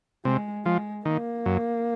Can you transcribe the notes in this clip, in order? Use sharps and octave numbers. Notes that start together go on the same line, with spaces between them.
C3 G#3
F3 G#3
D#3 A#3
F#2